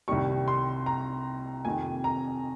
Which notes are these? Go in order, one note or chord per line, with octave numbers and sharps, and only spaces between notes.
C2 C3 D#3 G3 C#6
C6
A#5
F2 C3 D#3 G#5
A#5